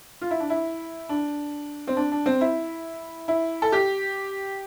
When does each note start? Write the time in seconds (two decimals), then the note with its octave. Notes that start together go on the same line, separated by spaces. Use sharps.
0.21 F4
0.31 E4
0.40 D4
0.50 E4
1.09 D4
1.88 C4
1.97 D4
2.12 D4
2.26 C4
2.41 E4
3.28 E4
3.62 A4
3.72 G4